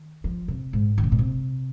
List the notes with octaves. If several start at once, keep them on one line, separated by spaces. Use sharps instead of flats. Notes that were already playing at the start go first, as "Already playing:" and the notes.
Already playing: D#3
F3
C3
G#2
D#3
C3
A#2
C3